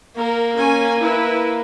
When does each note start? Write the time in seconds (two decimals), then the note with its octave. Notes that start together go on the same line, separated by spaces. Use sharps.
0.17 A#3 A#4
0.57 C#4 G#5
0.99 E4 B4